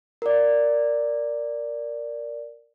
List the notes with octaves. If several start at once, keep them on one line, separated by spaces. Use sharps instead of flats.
A#4 D5